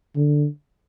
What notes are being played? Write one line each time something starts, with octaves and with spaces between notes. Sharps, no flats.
D3